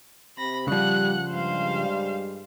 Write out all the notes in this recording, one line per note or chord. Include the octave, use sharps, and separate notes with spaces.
C3 B5 A#6
C#3 F3 G3 F#5 F#6
G2 G3 G#3 C5 F5